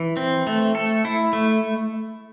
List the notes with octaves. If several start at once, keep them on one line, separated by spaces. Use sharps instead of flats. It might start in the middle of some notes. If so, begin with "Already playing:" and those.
Already playing: E3
C4
A3
A4
E4
A3